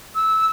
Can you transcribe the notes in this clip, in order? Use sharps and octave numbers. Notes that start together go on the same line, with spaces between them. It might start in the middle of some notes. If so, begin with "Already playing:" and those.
E6